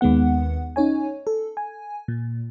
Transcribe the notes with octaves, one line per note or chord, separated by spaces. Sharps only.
D#2 D#3 G#3 B3 F#5
C#4 D#4 C#5 G#5
A4
G#5
A#2